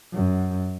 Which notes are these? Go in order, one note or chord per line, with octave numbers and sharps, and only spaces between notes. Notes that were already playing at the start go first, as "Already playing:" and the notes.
F#2